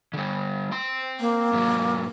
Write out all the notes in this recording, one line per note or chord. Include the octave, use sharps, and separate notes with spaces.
D3 G3
C4 C6
A#3
G#2 F#3